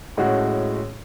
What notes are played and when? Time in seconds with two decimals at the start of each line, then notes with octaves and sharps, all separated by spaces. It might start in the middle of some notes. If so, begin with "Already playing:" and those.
0.17 A2 G#3 C#4 F#4